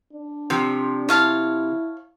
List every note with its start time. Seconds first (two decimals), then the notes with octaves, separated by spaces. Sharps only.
0.13 D4
0.50 C3 F3
1.09 E4 C#5 F5 A5